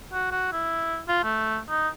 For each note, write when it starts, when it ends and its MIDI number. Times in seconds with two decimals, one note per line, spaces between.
0.12 0.31 66
0.31 0.52 66
0.52 1.00 64
1.08 1.22 65
1.23 1.58 57
1.69 1.89 63